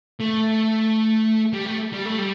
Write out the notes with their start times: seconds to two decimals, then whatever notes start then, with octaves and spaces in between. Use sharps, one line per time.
0.20 A3
1.53 G3
1.66 A3
1.93 G3
2.06 A3
2.19 G3